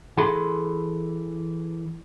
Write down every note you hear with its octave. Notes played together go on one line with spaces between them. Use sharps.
E3 G#4 A4 B5 C6